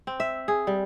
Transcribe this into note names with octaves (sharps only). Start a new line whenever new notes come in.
C4
E5
G#4
G3